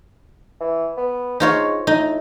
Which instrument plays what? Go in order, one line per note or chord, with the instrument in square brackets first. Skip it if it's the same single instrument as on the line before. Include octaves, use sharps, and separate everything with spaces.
[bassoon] E3
B3
[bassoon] G#2 [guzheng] D#4 F4 C#5
[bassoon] A2 [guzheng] D#4